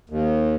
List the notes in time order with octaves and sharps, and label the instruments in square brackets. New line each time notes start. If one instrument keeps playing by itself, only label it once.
[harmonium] D#2